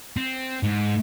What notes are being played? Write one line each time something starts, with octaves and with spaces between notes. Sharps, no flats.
C4
G#2